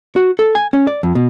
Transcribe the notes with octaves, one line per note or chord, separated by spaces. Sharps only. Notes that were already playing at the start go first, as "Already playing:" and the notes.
F#4
A4
G#5
C#4
D5
F2
B2